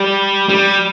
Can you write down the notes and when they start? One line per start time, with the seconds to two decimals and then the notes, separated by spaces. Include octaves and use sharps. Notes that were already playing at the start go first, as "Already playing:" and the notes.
Already playing: G3
0.49 G3